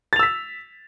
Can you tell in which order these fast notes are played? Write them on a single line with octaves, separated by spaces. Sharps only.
A6 F7 E6 B6